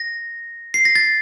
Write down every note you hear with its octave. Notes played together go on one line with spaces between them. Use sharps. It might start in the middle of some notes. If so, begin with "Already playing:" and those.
Already playing: A#6
C7
A#6
A6